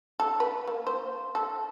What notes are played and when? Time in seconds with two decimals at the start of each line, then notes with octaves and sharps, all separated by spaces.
0.20 A4
0.40 B4
0.68 A#3
0.87 C5
1.35 A4